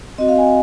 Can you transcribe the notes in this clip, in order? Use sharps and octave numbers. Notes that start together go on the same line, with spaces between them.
C4 F#4 D#5
F5
G#5